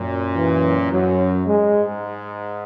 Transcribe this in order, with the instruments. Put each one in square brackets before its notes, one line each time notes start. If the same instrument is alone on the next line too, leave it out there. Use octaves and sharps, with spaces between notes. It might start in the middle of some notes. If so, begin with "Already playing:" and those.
Already playing: [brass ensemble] F#2 A#2
[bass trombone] E3
[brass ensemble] F#2 [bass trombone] F#3
[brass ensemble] G#2 [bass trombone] G#3